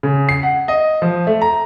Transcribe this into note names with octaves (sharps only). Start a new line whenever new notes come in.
C#3
C7
F#5
D#5
F3
A3
A#5